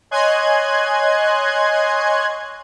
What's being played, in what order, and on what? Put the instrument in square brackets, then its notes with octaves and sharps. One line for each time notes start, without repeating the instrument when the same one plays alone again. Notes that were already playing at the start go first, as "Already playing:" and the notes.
[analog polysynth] C#5 D#5 G#5 C6 F#6 G#6